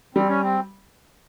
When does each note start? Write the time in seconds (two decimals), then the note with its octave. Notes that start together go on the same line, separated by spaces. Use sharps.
0.15 G3 C4
0.28 C#4
0.42 C4